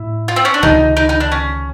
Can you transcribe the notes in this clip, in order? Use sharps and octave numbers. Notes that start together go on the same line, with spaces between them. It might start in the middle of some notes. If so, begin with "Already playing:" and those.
Already playing: A2 E4
F4
C4
C#4
D4
C#2 C3 D#3 D#4
D#4
D#4
D4
C#4